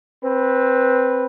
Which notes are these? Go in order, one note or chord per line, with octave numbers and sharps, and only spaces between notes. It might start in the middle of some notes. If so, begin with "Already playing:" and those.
C4 B4